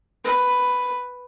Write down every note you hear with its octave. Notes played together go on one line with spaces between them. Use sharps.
B4